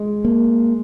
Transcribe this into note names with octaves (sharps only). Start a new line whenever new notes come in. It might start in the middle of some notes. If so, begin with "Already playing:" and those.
Already playing: G#3
A#3